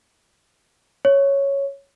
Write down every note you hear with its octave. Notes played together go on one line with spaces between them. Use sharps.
C#5